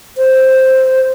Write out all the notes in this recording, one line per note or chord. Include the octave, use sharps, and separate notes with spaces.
C5